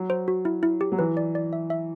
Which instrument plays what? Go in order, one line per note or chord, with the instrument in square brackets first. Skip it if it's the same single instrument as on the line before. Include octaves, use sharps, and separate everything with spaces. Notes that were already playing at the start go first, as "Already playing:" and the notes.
Already playing: [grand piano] F#3
[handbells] C5
F#4
E4
E4
G4
[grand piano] F#3
[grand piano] E3 [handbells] B4
[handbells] D5
D5
E5
E5